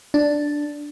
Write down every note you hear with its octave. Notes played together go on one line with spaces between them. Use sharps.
D4